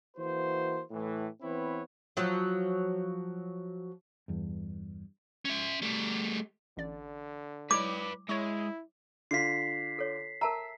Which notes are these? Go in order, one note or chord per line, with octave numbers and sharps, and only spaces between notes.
E3 A#3 F#4 C5
A2 E3
E3 B3 C4 E4 B4 C#5
F3 F#3
E2 G2
C#4 E5
G3 A3
A1 D3 D5
G#3 E4 B4 C#5 D5 D6
G#3 E4 C#5 C#6
D3 F4 B6 C7
A4 C#5
A#4 E5 A5 A#5